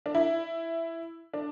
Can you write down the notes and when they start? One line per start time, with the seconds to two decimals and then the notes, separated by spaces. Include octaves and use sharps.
0.06 D4
0.15 E4
1.34 D4